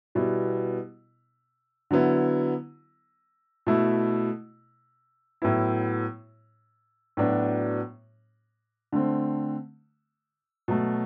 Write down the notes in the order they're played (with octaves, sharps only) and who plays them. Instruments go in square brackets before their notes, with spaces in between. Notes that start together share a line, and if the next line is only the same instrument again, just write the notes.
[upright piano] B2 G3 B3 E4
D3 F#3 B3 E4
B2 A3 E4
A2 F#3 B3 E4
A2 F#3 B3 D4 F#4
D3 A3 C4
B2 F#3 A3